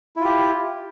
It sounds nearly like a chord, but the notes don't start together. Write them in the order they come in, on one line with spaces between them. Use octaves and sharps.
E4 F4 G4